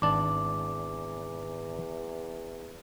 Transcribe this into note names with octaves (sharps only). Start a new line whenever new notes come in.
G#1 E2 D4 A5 D6